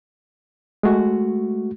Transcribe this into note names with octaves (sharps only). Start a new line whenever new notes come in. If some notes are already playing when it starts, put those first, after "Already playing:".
G#3 A3 F#4